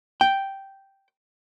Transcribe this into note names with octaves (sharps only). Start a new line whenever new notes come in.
G5